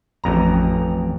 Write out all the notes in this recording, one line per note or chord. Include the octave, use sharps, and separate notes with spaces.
A1 F2 A#5